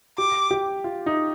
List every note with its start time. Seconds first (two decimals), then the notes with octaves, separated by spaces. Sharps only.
0.18 G4 D6
0.51 G4
0.84 F4
1.06 D#4